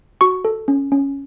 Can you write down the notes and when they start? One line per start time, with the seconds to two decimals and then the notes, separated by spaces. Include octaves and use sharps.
0.21 F#4 C#6
0.45 A4
0.68 C#4
0.92 C#4